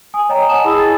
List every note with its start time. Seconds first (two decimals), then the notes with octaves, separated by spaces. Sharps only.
0.14 G#5 D#6
0.29 C#5 D#5 G5 A#5
0.49 D#5 F#5 G#5 A5 D#6 E7
0.64 E4 G#4 B5 D#6 E6
0.79 A6